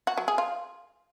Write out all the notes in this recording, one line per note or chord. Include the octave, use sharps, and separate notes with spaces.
F#4
F#3
G#4
F4